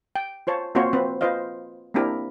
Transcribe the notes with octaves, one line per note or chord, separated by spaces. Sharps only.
G5
F4 C5 C#5 A5
A#3 C4 F4 F#4 C5 C#5
C4 B4 C5
F4 B4 C5 D#5 F5
A#3 C4 D4 E4 G4 A#4